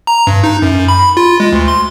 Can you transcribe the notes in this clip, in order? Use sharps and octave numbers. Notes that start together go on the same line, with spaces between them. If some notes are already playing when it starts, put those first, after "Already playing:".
A#5
G2
D#4
F#2
B5
F4
G#3
D2
C6